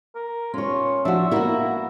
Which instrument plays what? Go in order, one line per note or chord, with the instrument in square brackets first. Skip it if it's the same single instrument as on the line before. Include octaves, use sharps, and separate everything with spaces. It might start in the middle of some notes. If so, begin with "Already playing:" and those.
[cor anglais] A#4
[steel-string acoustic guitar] C#4 C#5 [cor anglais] F4
[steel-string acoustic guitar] F3 [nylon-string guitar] D4 F#4 [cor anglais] E5
[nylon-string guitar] A#3 B3 E4 [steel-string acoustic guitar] F#4 A#4